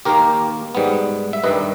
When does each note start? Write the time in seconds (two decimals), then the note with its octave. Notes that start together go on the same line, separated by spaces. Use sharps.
0.05 D#2 D#3 A#3 G4 A#4
0.75 G#2 G3 B3
1.33 E5
1.43 G2 D#3 G3 B4 D#5